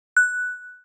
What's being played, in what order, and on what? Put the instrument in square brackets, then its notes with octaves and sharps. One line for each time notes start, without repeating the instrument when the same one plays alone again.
[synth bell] F#6